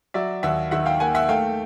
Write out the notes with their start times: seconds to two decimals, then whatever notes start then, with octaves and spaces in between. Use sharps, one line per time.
0.14 F#3 D5 E5
0.43 D#2 E5 F#5
0.71 D#3 E5 F#5
0.86 F5 G5
1.00 A#3 F#5 G#5
1.15 E5 F#5
1.29 A3 F5 G5